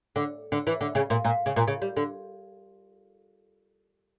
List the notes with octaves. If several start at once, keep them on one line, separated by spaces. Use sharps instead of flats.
D3
D3
E3
D3
C#3
A#2
A#2
C#3
A#2
C#3
G3
D3